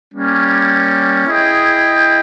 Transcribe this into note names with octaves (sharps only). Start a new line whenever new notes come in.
G3 A#3 C#4
E4 G#4 D#5 G5